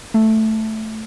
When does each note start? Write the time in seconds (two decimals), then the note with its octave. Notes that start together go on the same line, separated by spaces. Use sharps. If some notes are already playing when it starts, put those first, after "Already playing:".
0.14 A3